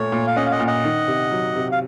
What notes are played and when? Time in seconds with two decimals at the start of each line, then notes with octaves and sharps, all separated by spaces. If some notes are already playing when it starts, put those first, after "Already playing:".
Already playing: A#2 A3 C#5
0.12 A#2
0.27 F5
0.36 C#4 D#5 F#5
0.46 F5
0.52 D#5 F#5
0.60 A#2
0.67 D#5 F#5
0.84 D#3
1.08 C3
1.31 F#3
1.56 C3
1.72 F5